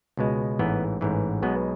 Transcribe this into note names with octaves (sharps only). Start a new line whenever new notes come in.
C#2 B2 G#3
A1 G#2 E3 B3
A1 G#2 E3
B1 B2 G#3 B3